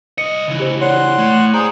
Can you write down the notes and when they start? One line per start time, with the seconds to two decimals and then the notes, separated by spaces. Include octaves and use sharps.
0.18 C2 D#5 C#7
0.47 C#3 E3
0.60 G4 C5
0.81 C#5 D5 F#5 C6
1.19 A2
1.54 G4 G#4 C5 D5 A#5